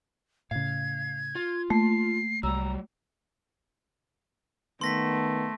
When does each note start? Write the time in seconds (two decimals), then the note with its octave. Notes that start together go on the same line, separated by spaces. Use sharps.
0.51 A2 C#3 F5 G#6
1.35 F4
1.70 A3 A#3 C7
2.43 C2 F#3 G3 A#5 E6
4.81 D#3 A3 B3 C6 A#6 B6